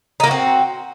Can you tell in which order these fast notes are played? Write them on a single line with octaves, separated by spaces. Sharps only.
D#4 A#3 F#4 C4